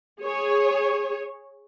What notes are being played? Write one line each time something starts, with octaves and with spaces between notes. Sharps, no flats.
G#4 C#5